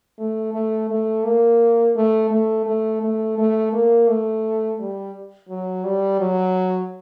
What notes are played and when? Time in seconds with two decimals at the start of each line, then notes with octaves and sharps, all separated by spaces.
0.18 A3
0.53 A3
0.90 A3
1.24 A#3
1.96 A3
2.31 A3
2.66 A3
3.01 A3
3.38 A3
3.72 A#3
4.08 A3
4.79 G3
5.49 F#3
5.84 G3
6.20 F#3